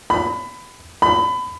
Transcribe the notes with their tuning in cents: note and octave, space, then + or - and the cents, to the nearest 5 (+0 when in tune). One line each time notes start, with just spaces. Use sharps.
B5 +20
B5 +25